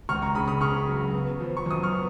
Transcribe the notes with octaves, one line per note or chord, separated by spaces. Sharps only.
C#2 C#6 F6
A#5 C#6
C#3 B5 D#6
B5 D#6
C#3 C#6 F6
F#3
B3
F3
C#6
F#2 D#6
C#6 F6
B3